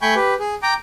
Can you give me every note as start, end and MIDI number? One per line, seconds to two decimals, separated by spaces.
0.02 0.14 57
0.02 0.14 79
0.02 0.14 80
0.02 0.14 83
0.02 0.14 85
0.02 0.14 91
0.15 0.34 67
0.15 0.34 71
0.39 0.54 68
0.63 0.74 79
0.63 0.74 82
0.63 0.74 86